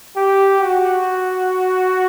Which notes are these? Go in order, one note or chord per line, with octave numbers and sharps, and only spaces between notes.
G4
F#4